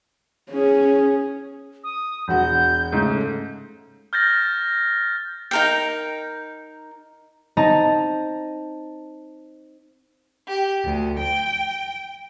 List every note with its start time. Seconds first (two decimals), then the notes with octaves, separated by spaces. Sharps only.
0.50 C#4 G#4
1.84 D#6
2.28 E1 F#4 G6
2.92 G#2 C#3 A3
4.13 F6 G6 A6 A#6
5.51 D#4 A#4 G5
7.57 C4 D#4 D#5 A5 A#5
10.47 G4
10.84 D2
11.18 G5